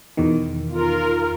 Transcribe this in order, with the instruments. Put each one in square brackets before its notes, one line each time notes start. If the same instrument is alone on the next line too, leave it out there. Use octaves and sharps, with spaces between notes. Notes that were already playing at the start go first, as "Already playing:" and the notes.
[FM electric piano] E2 B2 D#3
[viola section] F4 A#4